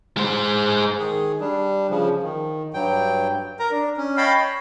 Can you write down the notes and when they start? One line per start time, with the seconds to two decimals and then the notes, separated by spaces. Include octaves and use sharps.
0.17 G#3 C5
0.99 D#3 G#4
1.40 G3 D4
1.90 C#3 F3
2.22 D#3
2.74 G2 F#3 G5
3.59 A#4 A#5
3.71 D4
3.97 C#4
4.17 C#5 D#5 F5 G5 A5 B5
4.39 C#5